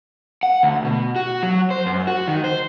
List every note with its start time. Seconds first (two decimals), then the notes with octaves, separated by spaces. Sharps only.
0.43 F#5
0.63 D2
0.85 B2
1.16 F#4
1.43 F#3
1.71 C5
1.86 F#2
2.07 F#4
2.28 D#3
2.44 C5